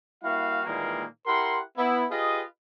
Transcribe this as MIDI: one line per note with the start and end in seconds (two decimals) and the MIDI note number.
0.23 0.63 55
0.23 0.63 58
0.23 0.63 64
0.23 0.63 66
0.23 0.63 77
0.65 1.03 46
0.65 1.03 51
0.65 1.03 52
0.65 1.03 55
0.65 1.03 56
0.65 1.03 58
1.27 1.59 64
1.27 1.59 67
1.27 1.59 70
1.27 1.59 78
1.27 1.59 84
1.77 2.04 59
1.77 2.04 64
2.10 2.41 65
2.10 2.41 67
2.10 2.41 68
2.10 2.41 71
2.10 2.41 75